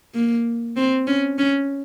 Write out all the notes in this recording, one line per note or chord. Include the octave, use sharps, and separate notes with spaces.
A#3
C4
C#4
C#4